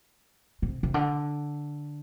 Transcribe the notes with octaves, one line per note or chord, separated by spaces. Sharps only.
C3
C3
D3